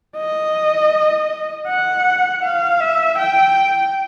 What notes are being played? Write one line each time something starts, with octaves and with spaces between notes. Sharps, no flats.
D#5
F#5
F5
E5
G5